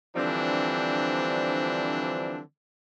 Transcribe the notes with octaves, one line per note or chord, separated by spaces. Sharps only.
D3 E3 F3 G3 C4 D4